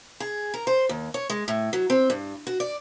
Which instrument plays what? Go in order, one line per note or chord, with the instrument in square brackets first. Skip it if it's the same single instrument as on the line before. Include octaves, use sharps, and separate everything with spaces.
[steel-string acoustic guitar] G#4
A#4
C5
D#2
C#5
G#3
A2
F#3
C4
G2
F#4
D5